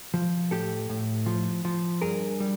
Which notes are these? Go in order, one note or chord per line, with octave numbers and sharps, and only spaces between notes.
F3
A2 G4 A4
A2
F3
F3
G2 G#4 A#4
G3